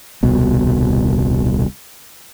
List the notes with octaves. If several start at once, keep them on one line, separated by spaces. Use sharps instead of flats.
D#1 C2 B2